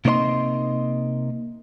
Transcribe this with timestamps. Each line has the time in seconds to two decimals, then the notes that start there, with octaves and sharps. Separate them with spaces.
0.05 C3 A#3 D#4 C#5 D#5 C6